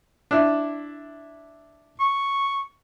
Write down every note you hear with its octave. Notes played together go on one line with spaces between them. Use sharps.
D4 E4
C#6